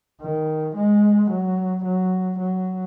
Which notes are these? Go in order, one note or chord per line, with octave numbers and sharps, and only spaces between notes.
D#3
G#3
F#3
F#3
F#3